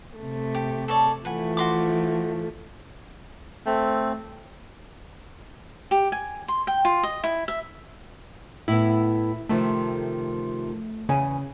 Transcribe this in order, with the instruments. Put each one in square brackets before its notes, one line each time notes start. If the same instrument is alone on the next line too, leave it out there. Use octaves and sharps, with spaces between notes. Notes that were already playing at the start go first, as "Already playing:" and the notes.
[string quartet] C3 A3
[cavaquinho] G4
A4 C#5 D5
[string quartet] E3 F3 A3 [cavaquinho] B4 F#5 G#5
[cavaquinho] F#4 C6 D6
[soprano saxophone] A3 [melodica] C4
[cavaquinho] G4
G#5
C6
G5
F4
D#5
E4
E5
[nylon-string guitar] A2 B3 [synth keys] E4
[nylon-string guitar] C3 D#3 F3 [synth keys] A3
[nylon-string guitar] E2 G#5 [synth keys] C#3